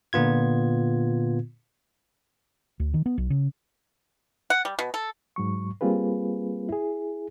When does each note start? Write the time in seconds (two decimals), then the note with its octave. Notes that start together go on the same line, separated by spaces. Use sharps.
0.13 A#2 D3 B3 F4 G#6
2.80 D2
2.94 D#3
3.06 B3
3.18 B1
3.30 C#3
4.50 F#5
4.65 G3
4.79 B2
4.94 A4
5.36 G#2 F#3 C#6
5.81 G3 A#3 C4 F4 G#4 B4
6.69 E4 G#4